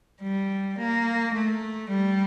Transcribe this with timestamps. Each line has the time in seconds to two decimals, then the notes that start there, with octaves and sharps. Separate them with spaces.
0.22 G3
0.78 A#3
1.34 A3
1.89 G3